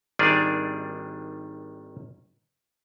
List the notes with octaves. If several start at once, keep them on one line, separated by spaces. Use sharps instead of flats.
G#1 D#3 G3 D4 G#4 D5